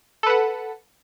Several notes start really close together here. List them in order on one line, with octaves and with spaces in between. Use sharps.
A4 B4 F#5